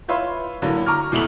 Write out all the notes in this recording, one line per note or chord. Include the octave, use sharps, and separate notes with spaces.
F4 B4 C#5 E5 F5 C6
A2 D3 F#3 A#3
A#5 C#6 D6 F6
E2 B2 A3 E4 F7 F#7